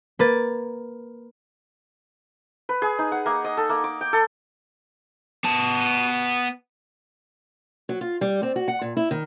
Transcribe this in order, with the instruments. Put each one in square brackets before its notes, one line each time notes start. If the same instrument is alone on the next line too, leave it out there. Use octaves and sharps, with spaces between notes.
[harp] A#3 B4 A6
[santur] B4
G#4
D#4
F#5
A#3
D#5
A4
A#3
D6
G5
A4
[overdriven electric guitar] B3 A5
[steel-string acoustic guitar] F#3
F4
G3
C4
F#4
F#5
A#2
E4
D#3